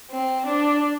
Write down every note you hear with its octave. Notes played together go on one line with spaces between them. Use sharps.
C4
D4